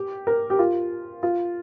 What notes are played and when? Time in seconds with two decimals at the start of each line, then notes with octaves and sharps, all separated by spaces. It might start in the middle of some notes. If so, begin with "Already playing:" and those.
Already playing: G4
0.27 A#4
0.50 G4
0.59 F4
1.23 F4